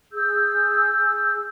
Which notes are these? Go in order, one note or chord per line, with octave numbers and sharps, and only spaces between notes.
G#4 E6 G6